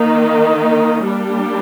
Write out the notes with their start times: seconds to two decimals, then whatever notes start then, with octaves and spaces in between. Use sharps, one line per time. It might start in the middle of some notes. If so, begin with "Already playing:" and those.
Already playing: D#3 A#3 D#4
1.06 G3 A#3 D4 G4